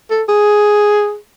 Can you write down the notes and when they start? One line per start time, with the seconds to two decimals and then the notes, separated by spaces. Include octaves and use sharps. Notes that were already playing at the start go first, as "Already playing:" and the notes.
0.10 A4
0.29 G#4